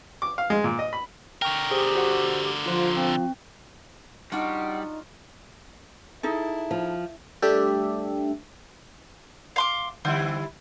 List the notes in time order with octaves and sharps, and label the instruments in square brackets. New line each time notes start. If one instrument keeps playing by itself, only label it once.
[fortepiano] D6
F5
G#3
A#2
D#5
B5
[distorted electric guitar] D3 A#4 [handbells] G5 C#6
[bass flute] G4 [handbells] G#4 C5
[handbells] F#4 C5 F#5
[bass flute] F3 [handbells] F4 C5
[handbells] C4
[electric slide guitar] G3 [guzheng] D4 F4 F#4 [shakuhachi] D#4 [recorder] F#5
[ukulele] D#4 G#4 A4 [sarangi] E4
[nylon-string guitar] F3
[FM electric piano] G3 A3 D4 G4 D5 E5
[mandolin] F5 C6 D6
[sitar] D3 G3 E4 [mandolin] C4